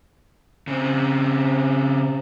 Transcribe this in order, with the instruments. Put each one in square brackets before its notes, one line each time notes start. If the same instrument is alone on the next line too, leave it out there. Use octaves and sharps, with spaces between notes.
[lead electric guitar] C#3 C4